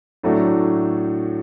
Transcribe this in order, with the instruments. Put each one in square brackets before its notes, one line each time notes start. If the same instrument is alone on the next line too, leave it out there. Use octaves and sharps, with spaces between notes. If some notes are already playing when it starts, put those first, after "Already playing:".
[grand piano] A2 F#3 A3 D4